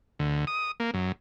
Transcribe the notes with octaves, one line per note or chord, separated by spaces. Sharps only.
D2
D#6
A#3
F#2